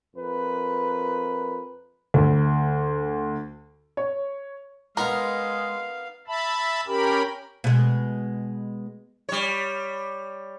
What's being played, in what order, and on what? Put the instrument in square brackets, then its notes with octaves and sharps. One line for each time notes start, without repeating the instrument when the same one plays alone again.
[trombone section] F2 A#4 B4
[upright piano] D2
C#5
[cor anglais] G#3 [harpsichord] B3 D#4 [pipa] A#4 [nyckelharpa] F5
[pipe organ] E5 A5 B5
C#4 G4 A#4 B5
[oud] B2 G#3
[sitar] G3 C#5